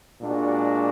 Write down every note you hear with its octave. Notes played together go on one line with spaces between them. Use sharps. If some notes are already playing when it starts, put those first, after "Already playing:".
A#2 G#3 D4 F#4